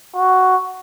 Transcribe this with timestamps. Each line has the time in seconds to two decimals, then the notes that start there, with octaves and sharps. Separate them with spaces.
0.16 F#4